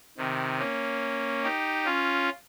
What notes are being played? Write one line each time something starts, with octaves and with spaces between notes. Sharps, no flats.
C3 D#3
A#3 C#4
D#4 G4
C#4 F4